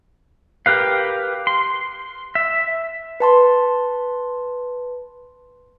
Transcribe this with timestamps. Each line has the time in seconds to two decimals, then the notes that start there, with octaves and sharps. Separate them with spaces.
0.66 G4 A#4 B4 F5
1.47 C6
2.35 E5
3.20 B4 A5 C6